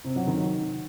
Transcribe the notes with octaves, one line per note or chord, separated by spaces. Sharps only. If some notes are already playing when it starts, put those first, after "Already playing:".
C3
F#3
D#3